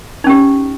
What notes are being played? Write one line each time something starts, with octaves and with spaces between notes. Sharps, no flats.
C#4 D#4 G4